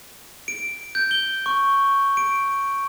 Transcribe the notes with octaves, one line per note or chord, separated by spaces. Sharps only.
D7
G6
G7
C#6
D7